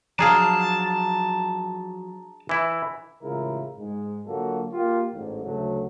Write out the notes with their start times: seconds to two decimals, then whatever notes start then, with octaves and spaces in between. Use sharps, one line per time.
0.19 F3 F#3 D4 G#4 F5 A5 A#5
2.49 E3 E4
3.22 A1 C#3 G#3 E4 F4 A#4
3.78 G#2 G#3
4.26 D3 F#3 A#3 F4 F#4 A4
4.72 A#3 F4 G4
5.14 A1 G#2
5.45 D2 C#3 F#3 A3